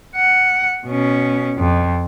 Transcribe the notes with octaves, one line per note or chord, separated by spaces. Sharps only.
F#5
B2 C#4
F2